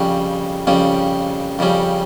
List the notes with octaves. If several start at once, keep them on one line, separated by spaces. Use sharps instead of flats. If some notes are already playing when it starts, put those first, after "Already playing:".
Already playing: F2 C#3 G3 C#4
F2 C#3 G3 C#4
F2 C#3 G3 C#4